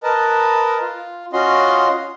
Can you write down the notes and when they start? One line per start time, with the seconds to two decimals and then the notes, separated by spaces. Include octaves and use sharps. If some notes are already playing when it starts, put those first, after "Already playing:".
0.03 A#4 B4 D#5 A5
0.82 F4
1.33 C#4 F4 F#4 D#5 C6